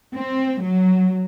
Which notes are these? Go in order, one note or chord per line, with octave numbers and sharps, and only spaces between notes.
C4
F#3